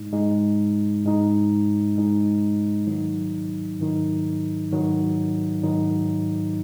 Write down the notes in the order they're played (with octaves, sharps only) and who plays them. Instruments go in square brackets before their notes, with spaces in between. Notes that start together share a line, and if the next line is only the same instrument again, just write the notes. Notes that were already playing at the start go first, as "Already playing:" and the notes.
Already playing: [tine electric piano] G#2 G#3 D#4
G#2 G#3 D#4
G#2 G#3 D#4
G#2 G#3 D#4
G#2 D#3 F#3 D#4
G#2 D#3 F#3 D#4
G#2 D#3 F#3 D#4
G#2 D#3 F#3 D#4